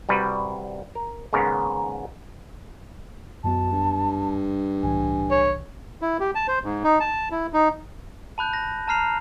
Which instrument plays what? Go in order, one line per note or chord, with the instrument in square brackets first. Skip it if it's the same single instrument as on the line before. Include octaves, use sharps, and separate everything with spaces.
[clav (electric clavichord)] C2 G3 F#4 B4
A#4
D#2 G#2 C#3 B3 A#4
[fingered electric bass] F#2 B3 [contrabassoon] B2 [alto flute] A5
[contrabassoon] G2
[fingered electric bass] C2 A2 E3 [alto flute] G#5
[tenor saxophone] C#5
[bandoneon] E4
G4
A5
C5
G#2
D#4
A5
E4
D#4
[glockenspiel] A5 B5 F#6 G6
A#6
A5 A#5 F6 C7 F7